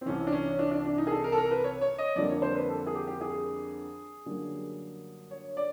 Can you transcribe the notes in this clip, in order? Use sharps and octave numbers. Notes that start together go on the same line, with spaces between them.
C4
C2 C3 E3 C#4
D4
C#4
D4
D4
D4
D#4
G#4
A4
A#4
A4
A#4
B4
C#5
C#5
D#5
F2 D3 G3 A#3 D5
C#5
C5
B4
A4
G#4
G4
G4
G#4
F#2 D3 G3 A#3
C#5
D5